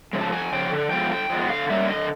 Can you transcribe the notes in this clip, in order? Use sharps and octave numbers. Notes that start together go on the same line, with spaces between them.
C#3 F3 G#3
A5
F2 G#5
C#3 F3 G5
D3
F3 G#3 B3 G5
D3 G5
F3 G#3 B3
D3 F5
G3 A#3 C#4 E5
D3 D#5